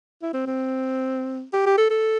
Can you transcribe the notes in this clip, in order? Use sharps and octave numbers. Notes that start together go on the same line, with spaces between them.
E4
C4
C4
G4
G4
A4
A4